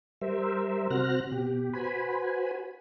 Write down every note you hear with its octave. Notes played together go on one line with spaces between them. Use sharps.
G3 A#4 C5 E5
C3 F#4 C5 F6 F#6 A#6
B2 G4
F#4 B4 C5 G#5 B5